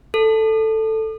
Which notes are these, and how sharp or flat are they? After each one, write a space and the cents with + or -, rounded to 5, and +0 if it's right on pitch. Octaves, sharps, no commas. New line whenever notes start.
A4 +5